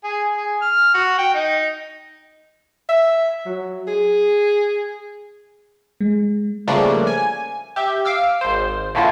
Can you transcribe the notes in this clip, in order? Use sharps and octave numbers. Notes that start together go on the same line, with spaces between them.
G#4
G#4
F6
F#4
G5
D#4
E5
F#3
G#4
G#3
C#3 F3 G3 A3 A#3 D4
G#5
G4 E5
F5 D6 E6 F6
G#1 C5
A2 D3 A3 A#3 E4 F4